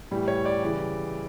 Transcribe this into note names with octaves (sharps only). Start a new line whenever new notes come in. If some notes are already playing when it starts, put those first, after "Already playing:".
A2 E3 G3
C#5
D5
C#3 E3 G3